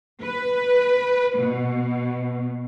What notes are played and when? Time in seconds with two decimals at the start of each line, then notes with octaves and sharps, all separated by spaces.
0.21 B4
1.37 B2